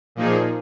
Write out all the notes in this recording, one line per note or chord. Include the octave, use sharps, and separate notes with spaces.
A#2 F3 A#3 D#4 G#4